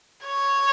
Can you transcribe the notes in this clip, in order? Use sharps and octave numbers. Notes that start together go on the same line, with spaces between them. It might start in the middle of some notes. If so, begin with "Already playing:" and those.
C#5